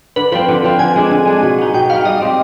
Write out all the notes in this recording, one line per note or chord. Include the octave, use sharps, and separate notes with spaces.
D3 B4
F3 C4 B4
D3
F3 C4
D3 G#5
G#3 D4 G#4
D3
G#3 D4 G#4
B2
B3 D#4
B2 G5
B3 D#4 F5
G3 D#5
C4 G4